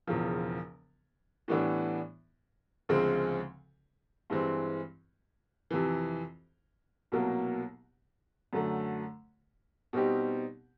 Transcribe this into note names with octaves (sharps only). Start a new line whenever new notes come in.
E1 E2 C#3 F3
A2 E3 G3 B3 D4
D2 C#3 F3 G#3 C4
G2 E3 G#3 C4
F2 C3 E3
C2 B2 F#3 A#3
F#2 D3 F#3 A3
B2 G3 C4 D#4 G4